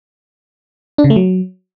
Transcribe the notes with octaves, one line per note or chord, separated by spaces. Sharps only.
D4
C#3
A3
F#3